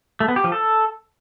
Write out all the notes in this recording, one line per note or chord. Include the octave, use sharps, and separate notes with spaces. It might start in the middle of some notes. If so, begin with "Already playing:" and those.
A3
B3
G4
F3
A4